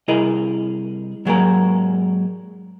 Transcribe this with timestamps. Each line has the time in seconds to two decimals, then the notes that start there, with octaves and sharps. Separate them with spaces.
0.08 C2 E4 G#4 A#4 D#5
1.25 G#2 F#3 G#3 A#3 A#4